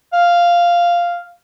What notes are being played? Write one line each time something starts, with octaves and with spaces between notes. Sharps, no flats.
F5